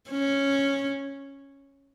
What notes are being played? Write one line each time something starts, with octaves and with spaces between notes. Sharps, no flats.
C#4